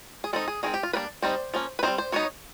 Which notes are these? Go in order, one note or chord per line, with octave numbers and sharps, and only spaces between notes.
G#4
G#3 C4 D#4 A4
G#4
D#3 G#3 C4 G#4
G4
F4
G3 A#3 D4 B4
G3 C4 D#4 C5
F3 A#3 C#4
B4
G3 C4 D#4 C5
C5
F#3 B3 D#4 C#5